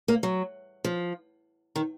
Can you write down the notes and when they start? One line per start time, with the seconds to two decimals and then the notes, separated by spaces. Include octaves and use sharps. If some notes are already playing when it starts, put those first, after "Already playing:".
0.08 A#3
0.23 F#3
0.84 F3
1.76 D#3